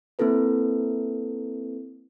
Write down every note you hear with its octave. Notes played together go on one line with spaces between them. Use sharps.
A#3 C4 E4 A4 B4